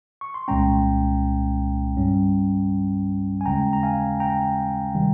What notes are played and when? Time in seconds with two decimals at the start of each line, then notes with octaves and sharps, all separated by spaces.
0.21 C#6
0.34 C6
0.48 C2 A#2 G#3 C#4 G5 A#5
1.97 G2 G3 C#4
3.41 G#5
3.46 D#2 C#3 G#3 C#4 G5 A#5
3.73 A#5
3.83 F5 G#5
4.20 G5 A#5
4.95 C3 D#3 G3